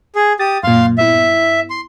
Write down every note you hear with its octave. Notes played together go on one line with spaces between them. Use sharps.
G#4
G4 D#6 A6
F#2 A#2 F5 C6
G2 B3 E4 E5
C6